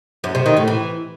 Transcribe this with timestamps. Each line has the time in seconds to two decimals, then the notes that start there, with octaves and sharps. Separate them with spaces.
0.24 F#2
0.35 C3
0.46 D#3
0.57 A2
0.68 E3